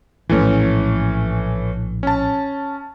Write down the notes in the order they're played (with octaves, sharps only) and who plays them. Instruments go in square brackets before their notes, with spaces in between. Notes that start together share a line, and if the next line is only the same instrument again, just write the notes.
[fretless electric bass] A#1 A2 [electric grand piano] E3 A3 C#4
[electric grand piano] C#4 A5